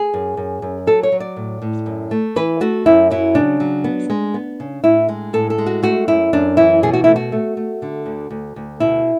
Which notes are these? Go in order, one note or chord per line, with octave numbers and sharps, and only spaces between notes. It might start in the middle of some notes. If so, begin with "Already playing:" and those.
Already playing: G#4
F#2
F#2
F#2
F#3 A4
C#5
F#3
D5
A2
A2
F#2
A3
E3 B4
A3 F#4
F#2 E4
F#3 E4
C#3 D4
F#3
B3
G#3
B3
C#3
A2 E4
G#3
A2 A4
A4
G#3
F#4
A3 F#4
F#2 E4
F#2 D4
E3 E4
B2 G#4
F#4
A3 E4
F#4
A3
A3
D3
D2
D2
D2
B2 E4